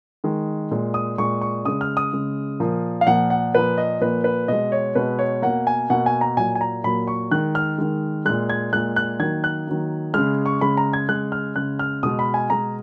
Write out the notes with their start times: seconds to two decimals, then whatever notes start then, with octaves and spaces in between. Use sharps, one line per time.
0.24 D#3 G#3
0.71 A#2 G#3
0.94 D#6
1.18 A#2 G#3 C#6
1.42 C#6
1.65 C#3 G#3 D#6
1.81 F6
1.97 D#6
2.13 C#3 G#3
2.60 A#2 F3 A#3
3.01 F5
3.07 A#2 F3 A#3 F#5
3.30 F#5
3.54 A#2 F3 A#3 B4
3.78 D#5
4.01 A#2 F3 A#3 B4
4.24 B4
4.48 B2 G#3 D#5
4.72 C#5
4.95 B2 G#3 B4
5.19 C#5
5.42 B2 A#3 F#5
5.67 G#5
5.90 B2 A#3 F#5
6.06 G#5
6.21 A#5
6.37 A#2 F#3 A#3 G#5
6.55 G#5
6.61 A#5
6.84 A#2 F#3 A#3 B5
7.07 C#6
7.31 D#3 G#3 F#6
7.55 F6
7.78 D#3 G#3
8.25 A#2 G#3 F#6
8.50 G#6
8.73 A#2 G#3 F#6
8.96 F#6
9.20 D#3 F#3 A#3 G#6
9.44 F#6
9.67 D#3 F#3 A#3
10.14 C#3 G#3 F6
10.46 C#6
10.61 C#3 G#3 B5
10.77 A#5
10.93 G#6
11.09 C#3 G#3 F#6
11.32 F6
11.56 C#3 G#3 F#6
11.79 F6
12.03 B2 G#3 D#6
12.19 B5
12.34 G#5
12.50 B2 G#3 A#5